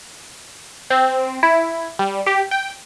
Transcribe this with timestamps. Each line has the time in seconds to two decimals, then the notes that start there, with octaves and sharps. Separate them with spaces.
0.90 C4
1.43 E4
1.99 G3
2.26 G4
2.51 G5